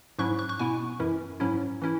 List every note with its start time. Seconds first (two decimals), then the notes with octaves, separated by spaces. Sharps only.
0.19 G#2 F#3 C#4 E4 C#6 F#6
0.39 C#6 F#6
0.49 C#6 F#6
0.59 B2 B3 E4 G#5 C#6
1.00 F#2 E3 C#4 E4
1.40 G#2 F#3 C#4 E4
1.82 E3 C#4 E4